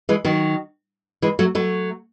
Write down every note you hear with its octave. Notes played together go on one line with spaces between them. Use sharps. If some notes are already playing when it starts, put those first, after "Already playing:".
E3 G#3
D#3 F#3
E3 G#3
F#3 A3
F#3 A3